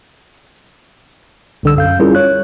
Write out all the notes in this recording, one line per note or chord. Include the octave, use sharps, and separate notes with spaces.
C2 D3 E6
F#2 F5 G6
G3 C#4 E4 F4 G#4 A#4
C#5 F#6